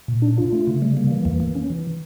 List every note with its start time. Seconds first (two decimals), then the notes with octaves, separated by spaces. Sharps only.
0.08 A#2
0.22 D4
0.38 F4
0.52 A3
0.67 C#3
0.82 G3
0.97 A#3
1.11 E3
1.25 E2
1.40 A#3
1.55 C#4
1.70 E3